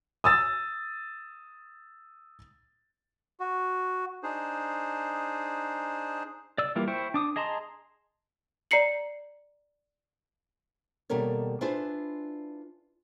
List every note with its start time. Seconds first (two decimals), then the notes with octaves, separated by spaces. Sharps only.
0.24 D#6 E6 A6
3.40 F#4
4.22 D4 D#4 G#4 C5
6.58 D5 E6
6.76 E3 G3 A#3 E4 F4
6.88 E4 C5 G5 C#6
7.14 D4 D6 D#6
7.36 G#4 D#5 A5 A#5 C6
8.71 D5 A#5 C7 C#7 F#7
11.10 D#2 B2 G3 A4 A#4 C#5
11.61 D4 E4 F4 G#4 B4 C5